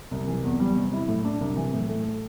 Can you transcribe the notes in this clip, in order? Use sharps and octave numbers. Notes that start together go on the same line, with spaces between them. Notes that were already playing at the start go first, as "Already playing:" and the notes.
C2
E3
E2
G3
C3
E4
A2
D4
C2
E3
A2
A3